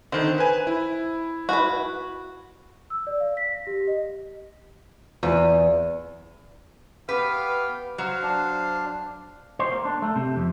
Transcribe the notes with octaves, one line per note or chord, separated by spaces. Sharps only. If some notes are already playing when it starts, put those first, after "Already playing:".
D3 D#3 C4
B4 G#5
E4
F#4 B4
E6
D5
F5
B6
A#6
G4
D#5
E2
B3 G4 B4 F5 G5
F#3 C5 F5
D4
C5
A#3
D4
A3
C3
F2